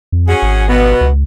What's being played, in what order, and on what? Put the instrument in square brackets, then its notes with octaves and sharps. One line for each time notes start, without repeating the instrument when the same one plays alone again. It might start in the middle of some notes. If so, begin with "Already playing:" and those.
[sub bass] F2
[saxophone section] C#4 F#4 G#4
[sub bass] G#1
[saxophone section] B2 B3
[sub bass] C#2